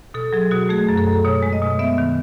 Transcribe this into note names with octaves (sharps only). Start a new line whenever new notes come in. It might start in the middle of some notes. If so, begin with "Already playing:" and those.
B2 A4
F#3 G#4
B2 F#4
A3 G#4
F#2
A4
F#2
B2 C#5
G#3
D#5
B2
B3 E5
D#3